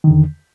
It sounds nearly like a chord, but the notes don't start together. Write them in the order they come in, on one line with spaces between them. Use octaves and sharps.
D#3 D3 E2